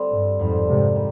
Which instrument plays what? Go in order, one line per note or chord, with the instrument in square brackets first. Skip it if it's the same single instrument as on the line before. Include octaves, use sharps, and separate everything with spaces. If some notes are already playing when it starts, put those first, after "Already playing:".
Already playing: [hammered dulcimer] D3 G3 C4
[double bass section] G2
[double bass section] F2 G#2 [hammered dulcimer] D3 G3 C4
[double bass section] G#2 C3
[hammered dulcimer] D#3 G3